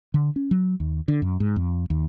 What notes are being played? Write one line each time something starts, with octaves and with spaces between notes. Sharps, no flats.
D3
C#4
F#3
D#2
D3
F#2
G#2
F2
D#2